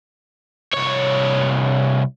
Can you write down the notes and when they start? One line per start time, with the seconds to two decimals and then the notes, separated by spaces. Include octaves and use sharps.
0.73 C2 C#5